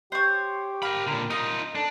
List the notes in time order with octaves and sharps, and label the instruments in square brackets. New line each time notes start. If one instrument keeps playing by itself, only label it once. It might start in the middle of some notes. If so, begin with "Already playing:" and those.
[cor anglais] G4 [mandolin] C5 C#5
[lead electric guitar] A#4 B5 [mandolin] F5
[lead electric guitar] A#2 D3 [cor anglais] A#4
[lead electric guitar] D#4 F4 [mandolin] D#6
[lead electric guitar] D4 [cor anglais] A4